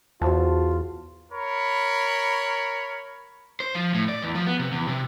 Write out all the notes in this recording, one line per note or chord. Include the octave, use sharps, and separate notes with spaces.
E2 F4 F#4 C5 A5
A#4 C#5 B5
C5
F3
A2
D5
E2
F3
B3
C3
E2
C3